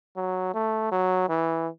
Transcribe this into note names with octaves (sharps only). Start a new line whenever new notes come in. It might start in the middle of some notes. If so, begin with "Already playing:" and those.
F#3
A3
F#3
E3